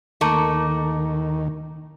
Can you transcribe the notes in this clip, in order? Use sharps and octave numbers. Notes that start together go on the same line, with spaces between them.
D#2 D#3 A3 A#3